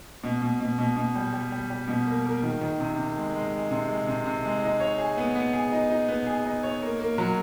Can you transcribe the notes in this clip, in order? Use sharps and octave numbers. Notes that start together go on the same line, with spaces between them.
B2
B2
B2
B2
B2
G3
G3
G3
G3
B2
A#3
A#3
D#3
D#3
C3
C3
G#3
G#3
G#3
C3
G#3
C3
C3
G#3
D#4
C#5
G#4
B3
B3
G#4
D#4
D#4
B3
G#4
D#4
C#5
A#3
A#3
F#3